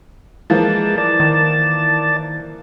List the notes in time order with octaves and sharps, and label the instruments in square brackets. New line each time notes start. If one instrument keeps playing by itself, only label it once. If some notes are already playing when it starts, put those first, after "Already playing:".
[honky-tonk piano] E3 F3 A#3 [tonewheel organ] G#3 A5
[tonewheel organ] D5 A5
[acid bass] D#3